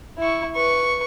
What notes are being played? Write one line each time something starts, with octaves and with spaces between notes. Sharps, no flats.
E4 C#6
B4 C#6